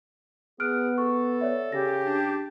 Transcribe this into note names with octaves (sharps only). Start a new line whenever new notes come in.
B3 G#4 F6 F#6 D7
A4 C#6
C#5 D5 E5
C#3 G4 A#6
D4